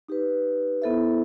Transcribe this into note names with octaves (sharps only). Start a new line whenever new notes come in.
D#4 G4 B4
B3 E4 A4 C5 E5